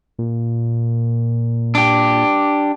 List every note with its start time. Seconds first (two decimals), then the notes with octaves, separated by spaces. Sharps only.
0.19 A#2
1.75 D4 G4